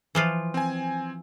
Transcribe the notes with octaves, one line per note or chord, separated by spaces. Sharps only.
E3 F3 F4
C4 G#5